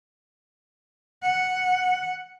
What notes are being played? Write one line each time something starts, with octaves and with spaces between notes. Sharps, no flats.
F#5